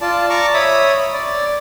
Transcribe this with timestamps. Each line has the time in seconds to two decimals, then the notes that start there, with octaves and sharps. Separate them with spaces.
0.01 F4 D5 A5
0.30 D5 A5 A#5 C#6 D6
0.54 C#5 E5 B5 D#6
1.14 D5